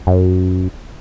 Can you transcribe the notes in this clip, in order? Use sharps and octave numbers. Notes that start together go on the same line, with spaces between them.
F#2